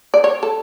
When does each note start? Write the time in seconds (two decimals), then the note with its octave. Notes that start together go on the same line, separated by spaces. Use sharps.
0.14 D5
0.24 C#5
0.43 A4